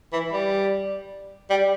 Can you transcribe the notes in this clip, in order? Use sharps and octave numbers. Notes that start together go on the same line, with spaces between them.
E3
G3
G3